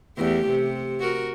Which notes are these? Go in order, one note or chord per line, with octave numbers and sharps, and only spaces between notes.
E2 A3 G4
C3
F#4 A#4